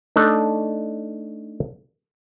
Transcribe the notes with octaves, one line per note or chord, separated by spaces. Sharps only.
A3 D4 D#4 A4